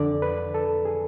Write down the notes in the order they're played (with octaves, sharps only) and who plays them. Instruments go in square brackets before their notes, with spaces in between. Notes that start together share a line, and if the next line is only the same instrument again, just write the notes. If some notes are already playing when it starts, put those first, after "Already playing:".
Already playing: [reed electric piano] F2 D3 D5
B4
A4
G#4